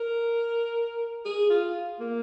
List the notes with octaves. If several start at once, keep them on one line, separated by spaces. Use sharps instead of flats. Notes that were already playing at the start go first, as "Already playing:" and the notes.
Already playing: A#4
G#4
F4
A#3